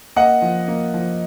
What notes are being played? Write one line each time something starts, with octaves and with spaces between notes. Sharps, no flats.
A#3 D#5 F#5
F3
A#3
F3